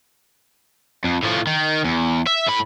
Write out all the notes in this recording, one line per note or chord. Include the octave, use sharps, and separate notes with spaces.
F2
A2 F3
D#3
E2
E5
A2 B5